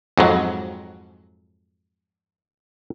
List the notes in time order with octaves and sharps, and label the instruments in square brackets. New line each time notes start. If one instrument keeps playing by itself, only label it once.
[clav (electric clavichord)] F2 G#2 F#3